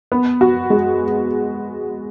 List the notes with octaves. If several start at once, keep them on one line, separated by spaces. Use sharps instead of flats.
B3
F#4
G#3